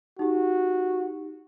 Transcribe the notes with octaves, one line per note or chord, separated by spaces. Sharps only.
D#4 F#4 G4